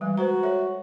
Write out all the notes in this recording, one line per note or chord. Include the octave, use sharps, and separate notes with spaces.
E3 G3 G#3
F#4 B4 C5 A#5
A4 C#5 E5